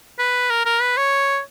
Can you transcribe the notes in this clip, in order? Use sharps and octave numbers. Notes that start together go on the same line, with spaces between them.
B4
A#4
A#4
B4
C#5